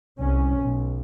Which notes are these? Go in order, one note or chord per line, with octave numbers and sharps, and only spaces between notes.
C2 C#4
B1